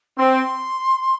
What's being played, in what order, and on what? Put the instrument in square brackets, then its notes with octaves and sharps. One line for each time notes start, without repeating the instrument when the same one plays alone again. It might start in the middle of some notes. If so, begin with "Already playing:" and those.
[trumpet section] C4 [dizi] C6